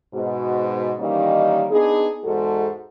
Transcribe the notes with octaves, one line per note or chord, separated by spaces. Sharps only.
G#2 B2 F#4
D#3 E3 G3 A#3 C#4 D#4
B3 D4 D#4 G#4
E2 G#2 G#3 F#4 A4